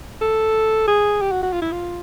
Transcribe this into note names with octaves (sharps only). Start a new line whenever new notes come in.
A4
G#4
G4
F#4
F#4
F4
E4
F4